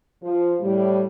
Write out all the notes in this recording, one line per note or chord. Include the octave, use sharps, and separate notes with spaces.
F3
A2 G3